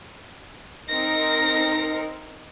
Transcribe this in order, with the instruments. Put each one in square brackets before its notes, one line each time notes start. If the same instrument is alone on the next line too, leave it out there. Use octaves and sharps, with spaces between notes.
[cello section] C4 D#4 A#4 [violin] A#6